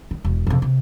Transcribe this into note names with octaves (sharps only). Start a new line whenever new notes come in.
D#3
E1
F2 C3
C3